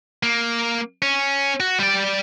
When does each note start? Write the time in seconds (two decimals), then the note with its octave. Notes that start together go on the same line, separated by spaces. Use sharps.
0.23 A#3
1.02 C#4
1.60 F#4
1.79 G3 D5